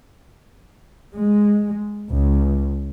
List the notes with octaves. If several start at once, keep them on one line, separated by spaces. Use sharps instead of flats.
G#3
C#2